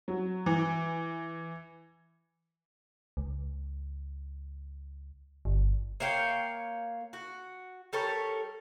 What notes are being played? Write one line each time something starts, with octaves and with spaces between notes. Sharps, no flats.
F#3
E3
C#2
G1
A#3 C#5 F5 G5
F#4
G3 A4 A#4 C#5